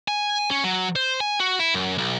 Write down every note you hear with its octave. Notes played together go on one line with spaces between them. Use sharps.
G#5
C#4
F#3
C5
G#5
F#4
E4
F#2
B1